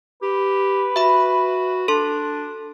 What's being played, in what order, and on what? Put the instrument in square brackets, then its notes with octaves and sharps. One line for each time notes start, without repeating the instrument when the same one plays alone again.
[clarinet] G4 [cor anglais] B4
[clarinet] F#4 [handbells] E5 B5
[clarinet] D4 [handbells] A4 C6